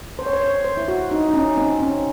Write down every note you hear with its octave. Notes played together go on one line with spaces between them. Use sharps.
C5
C#5
C5
C#5
C5
E4
F#4
D#4
D#4
C#4
C4
C#4